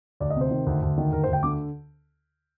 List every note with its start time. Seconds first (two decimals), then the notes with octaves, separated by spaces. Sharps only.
0.20 D2 D5
0.30 D#5
0.36 C3
0.41 C5
0.51 D#3
0.66 D2
0.82 D2
0.98 D#3
1.12 D2 A#4
1.23 C5
1.28 D2 G5
1.43 D3 D6